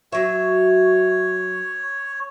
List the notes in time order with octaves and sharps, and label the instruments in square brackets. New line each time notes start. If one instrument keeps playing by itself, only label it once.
[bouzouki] F#3 E5 [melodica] C#5